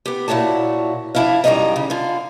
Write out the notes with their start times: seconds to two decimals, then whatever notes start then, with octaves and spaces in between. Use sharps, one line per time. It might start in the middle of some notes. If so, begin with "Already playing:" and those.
0.06 B3 G4
0.28 A#2 E4 F#4 C#5 A5
1.15 F2 D4 E4 E5 F5
1.44 F#2 D#3 F3 G3 D#5 A#5
1.76 C#3
1.90 D3 F4